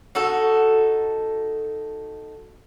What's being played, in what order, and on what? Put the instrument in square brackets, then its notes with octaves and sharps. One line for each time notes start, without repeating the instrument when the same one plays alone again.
[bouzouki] D#4 F#4 A4